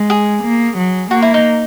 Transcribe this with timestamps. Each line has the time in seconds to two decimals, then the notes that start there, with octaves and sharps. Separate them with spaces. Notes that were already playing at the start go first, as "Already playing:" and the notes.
Already playing: G#3
0.10 G#4
0.44 A#3
0.78 F#3
1.11 A#3 F#4
1.22 E4
1.34 D#4